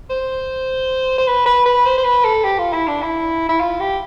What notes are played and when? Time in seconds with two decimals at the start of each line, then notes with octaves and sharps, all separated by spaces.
0.10 C5
1.18 C5
1.27 B4
1.46 B4
1.66 B4
1.86 C5
1.98 C5
2.04 B4
2.24 A4
2.44 G4
2.59 F4
2.73 E4
2.88 D4
3.02 E4
3.49 E4
3.61 F4
3.80 G4